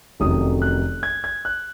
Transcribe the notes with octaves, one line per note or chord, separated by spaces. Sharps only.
F1 F2 D#3 F#3 C#4 D#6
F#6
G#6
G#6
F#6